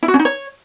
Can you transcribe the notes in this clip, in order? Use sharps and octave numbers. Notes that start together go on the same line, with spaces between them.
E4
F#4
C#4
D#4
C#5